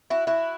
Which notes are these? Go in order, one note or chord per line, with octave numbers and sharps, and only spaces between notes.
E4 F#4
E4 F#4